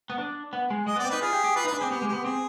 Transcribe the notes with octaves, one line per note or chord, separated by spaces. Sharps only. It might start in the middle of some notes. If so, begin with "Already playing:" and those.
B3
D4
B3
G#3
G#3 D#5
B3
D5
C4
D#4 B4
F4 G#4
G4
G4
F4 B4
D#4
B4
D4
C4 G#4
B3 G4
G#3
G4
B3
C4 G#4